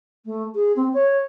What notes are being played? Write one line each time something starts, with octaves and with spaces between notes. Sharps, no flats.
A3
G#4
C4
C#5